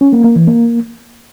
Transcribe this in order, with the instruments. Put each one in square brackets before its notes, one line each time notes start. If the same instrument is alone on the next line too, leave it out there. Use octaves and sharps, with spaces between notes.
[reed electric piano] C#4
A#3
A#3
E3
A#3